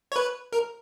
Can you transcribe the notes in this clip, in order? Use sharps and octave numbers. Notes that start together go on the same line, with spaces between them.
C#5
B4
A#4